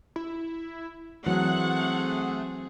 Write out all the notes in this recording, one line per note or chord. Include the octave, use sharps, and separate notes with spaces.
E4
E3 F#3 A3 C4 G#4 F#5